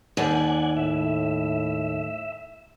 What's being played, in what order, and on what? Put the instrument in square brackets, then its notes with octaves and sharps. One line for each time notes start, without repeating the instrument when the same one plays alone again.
[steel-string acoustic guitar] D#2 [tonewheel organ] D5 F#5 G#5
[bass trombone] A2 [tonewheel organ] E5